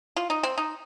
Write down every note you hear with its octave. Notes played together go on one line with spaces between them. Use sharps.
F4
D#4
C4
D#4